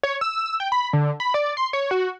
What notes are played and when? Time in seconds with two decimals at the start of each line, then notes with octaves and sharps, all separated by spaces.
0.03 C#5
0.21 E6
0.60 G5
0.72 B5
0.93 D3
1.20 B5
1.34 D5
1.57 C6
1.73 C#5
1.91 F#4